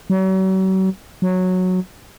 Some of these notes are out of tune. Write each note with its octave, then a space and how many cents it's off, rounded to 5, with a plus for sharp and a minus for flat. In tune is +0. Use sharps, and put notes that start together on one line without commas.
F#3 +40
F#3 -10